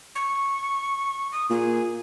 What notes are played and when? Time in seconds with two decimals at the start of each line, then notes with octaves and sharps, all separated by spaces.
0.15 C#6
1.32 D#6
1.50 A#2 G#4